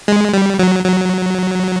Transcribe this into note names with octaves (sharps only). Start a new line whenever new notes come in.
G#3
G3
F#3
F#3